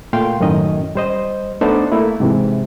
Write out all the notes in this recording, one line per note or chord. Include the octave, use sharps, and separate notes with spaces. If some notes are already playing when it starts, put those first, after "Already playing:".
A#2 A3 F5 G5 C6
F#2 A2 D#3 C#4 D#5
G3 C5 D#5
A3 B3 D4 D#4 A4 C5
A3 A#3 E4
G#2 C3 E3